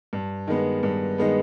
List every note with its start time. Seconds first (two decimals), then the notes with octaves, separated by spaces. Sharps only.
0.13 G2
0.47 D#3 G#3 B3
0.83 G2
1.18 D#3 G#3 B3